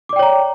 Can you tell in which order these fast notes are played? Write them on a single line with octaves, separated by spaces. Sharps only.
D6 D5 G5 C#5 A#5